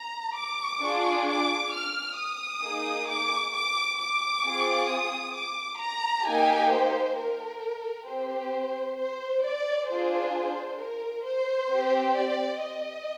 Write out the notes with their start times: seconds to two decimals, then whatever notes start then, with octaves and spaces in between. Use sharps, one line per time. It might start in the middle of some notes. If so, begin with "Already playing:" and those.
Already playing: A#5
0.36 D6
0.82 D4 F4 G#4
1.27 D6
1.73 F6
2.17 D#6
2.62 A#3 D#4 G#4
3.08 D6
3.53 D6
3.99 D6
4.45 C4 F4 G#4
4.89 D#6
5.34 D6
5.80 A#5
6.25 A#3 D#4 G4 G#5
6.71 C5
7.17 A#4
8.07 C4 G4 C5
8.97 C5
9.44 D5
9.88 D4 F4 G#4 C5
10.79 A#4
11.25 C5
11.70 C4 G4
12.15 D5
12.61 D#5